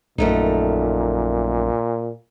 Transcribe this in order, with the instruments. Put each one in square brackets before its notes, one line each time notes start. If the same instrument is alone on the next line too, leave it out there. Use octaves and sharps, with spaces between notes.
[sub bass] A#1 [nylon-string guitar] F#2 A3 D#4 [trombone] A#2